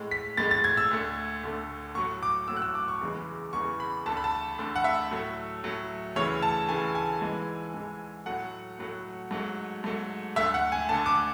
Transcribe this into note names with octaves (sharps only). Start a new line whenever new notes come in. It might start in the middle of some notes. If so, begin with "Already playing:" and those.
Already playing: A2 G#3
B6
A2 G#3 A6
A6
G#6
E6
D2 D3 A3
D2 D3 A3
A2 F#3 A3 C#6
D6
A2 F#3 A3 E6
F#6
E6
D6
C#6
E2 C#3 E3 G#3
E2 C#3 E3 G#3 C#6
B5
D2 D3 A3 A5
B5
A5
D2 D3 A3
F#5
E5
A2 F#3 A3
A2 F#3 A3
D2 C#3 E3 A3 C#5
A5
D2 C#3 E3 A3 G#5
G#5
G#2 E3 G#3
G#2 E3 G#3
A2 F#3 A3 F#5
A2 F#3 A3
G#2 F#3 A3
G#2 F#3 A3
D2 D3 A3 E5
F#5
G#5
D2 D3 A3 A5
D6